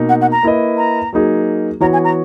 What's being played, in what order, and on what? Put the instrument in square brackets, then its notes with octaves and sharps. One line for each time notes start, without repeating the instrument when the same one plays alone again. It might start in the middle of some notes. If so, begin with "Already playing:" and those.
Already playing: [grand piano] B2 A#3 D#4
[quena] F#5
F#5
A#5
[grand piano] A#3 E4 B4 D#5
[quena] A#5
[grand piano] F#3 A#3 D#4 G#4
[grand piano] E3 B3 F#4 C#5 [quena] A#5
[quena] G#5
A#5